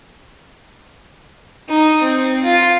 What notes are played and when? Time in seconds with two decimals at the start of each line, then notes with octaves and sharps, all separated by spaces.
1.69 D#4
2.02 C4
2.43 F4